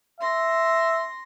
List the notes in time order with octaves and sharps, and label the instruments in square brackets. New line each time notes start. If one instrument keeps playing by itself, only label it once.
[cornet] E5 [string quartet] C6 A#6